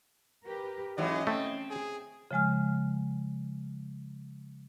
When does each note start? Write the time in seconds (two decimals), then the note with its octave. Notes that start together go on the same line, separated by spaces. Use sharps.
0.47 G4 A#4 B4
0.98 G#2 E3 F#3 C#4 D#5
1.27 A3 C4
1.70 G#4
2.31 C#3 F3 G#3 G#5 F6